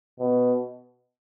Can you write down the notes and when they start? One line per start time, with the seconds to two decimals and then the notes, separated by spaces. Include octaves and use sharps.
0.19 B2